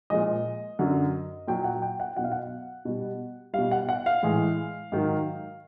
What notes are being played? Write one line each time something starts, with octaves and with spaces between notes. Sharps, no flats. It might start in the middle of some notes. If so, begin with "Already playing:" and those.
A#2 F3 G#3 D#5
F#2 D3 F#3
A#2 F#3 G5
F#5
G5
F#5
B2 F#3 F#5
F5
F#5
B2 G3
B2 G3 F5
F#5
F#5
F5
A2 E3 G#3
G#2 D#3 F#3